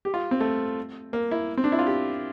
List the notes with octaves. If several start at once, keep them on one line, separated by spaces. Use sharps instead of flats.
G4
F4
C4
A3
A#3
E4
C4
D4
E4
F4
G4